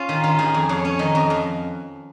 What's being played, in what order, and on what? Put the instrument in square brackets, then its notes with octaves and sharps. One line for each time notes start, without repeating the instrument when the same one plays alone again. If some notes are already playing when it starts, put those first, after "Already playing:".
Already playing: [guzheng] C#4 [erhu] F4
[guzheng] D#3
D#3
[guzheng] D#3 [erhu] G#4
[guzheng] F2
[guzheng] F2 [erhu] C#5
[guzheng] C#4
[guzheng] D#3 [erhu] D#5
[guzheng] F2
F2